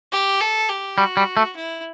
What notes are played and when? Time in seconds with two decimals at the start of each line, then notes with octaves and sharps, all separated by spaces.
0.12 G4
0.41 A4
0.69 G4
0.98 G3 F#4
1.17 G3
1.37 A3
1.56 E4